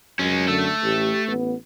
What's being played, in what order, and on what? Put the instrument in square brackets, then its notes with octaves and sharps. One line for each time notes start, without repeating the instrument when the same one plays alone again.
[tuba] F#2 [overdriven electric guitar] G#3 C#4
[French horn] D3 [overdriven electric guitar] A3 A4
[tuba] A1 [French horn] G4
[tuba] A1 [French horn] B3